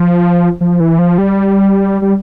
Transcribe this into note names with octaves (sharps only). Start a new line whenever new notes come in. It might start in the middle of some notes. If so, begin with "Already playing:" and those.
Already playing: F3
F3
E3
F3
G3
G3